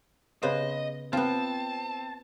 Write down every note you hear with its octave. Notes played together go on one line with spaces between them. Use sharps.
C#3 B3 C5 D#5
B3 C4 F4 A5